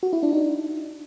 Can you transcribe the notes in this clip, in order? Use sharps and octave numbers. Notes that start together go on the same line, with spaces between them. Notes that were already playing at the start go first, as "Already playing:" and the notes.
F#4
E4
D4
D#4